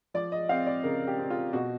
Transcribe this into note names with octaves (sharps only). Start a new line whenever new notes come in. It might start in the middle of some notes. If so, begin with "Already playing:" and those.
F3 D5
D#5
C4 F5
D5
C#3 A#4
G4
C4
F4
B2 F#4